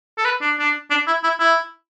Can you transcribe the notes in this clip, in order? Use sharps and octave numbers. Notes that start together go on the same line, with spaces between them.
A4
B4
D4
D4
D4
E4
E4
E4